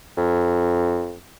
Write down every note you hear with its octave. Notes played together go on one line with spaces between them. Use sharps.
F2